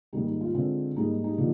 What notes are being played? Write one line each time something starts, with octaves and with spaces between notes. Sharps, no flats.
G#2 D#3 G3 A#3 D#4 G4
D#4
F4
D3 G#3 C4 F4
G#2 G3 A#3 D#4
D#4 G4
D3 F3 A#3